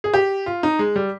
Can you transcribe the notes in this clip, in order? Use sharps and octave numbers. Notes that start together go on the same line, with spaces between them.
G#4
G4
F4
D#4
G#3
G3